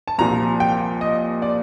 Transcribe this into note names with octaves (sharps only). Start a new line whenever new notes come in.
A5
C2 A#2 F3 A#5
G5
D#5
D5